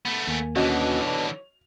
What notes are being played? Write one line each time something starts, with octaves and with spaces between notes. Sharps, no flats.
A3 B3 B5
D#2 A#3 G#5
B2 D3 E3 C#4 D4 F#4 D#5
C#5 F7